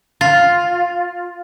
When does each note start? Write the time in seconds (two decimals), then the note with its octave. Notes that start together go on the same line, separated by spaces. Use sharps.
0.21 F4